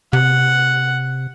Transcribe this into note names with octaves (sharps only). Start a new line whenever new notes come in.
C3 F#5